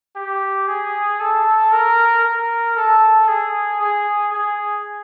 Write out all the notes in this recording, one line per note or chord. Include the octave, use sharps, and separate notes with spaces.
G4
G#4
A4
A#4
A#4
A4
G#4
G#4
G#4